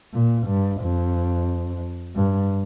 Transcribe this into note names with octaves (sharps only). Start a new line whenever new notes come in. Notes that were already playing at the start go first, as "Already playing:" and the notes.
A#2
G2
F2
G2